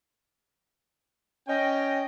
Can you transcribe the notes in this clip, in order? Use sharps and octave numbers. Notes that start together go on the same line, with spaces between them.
C#4 D#5 G5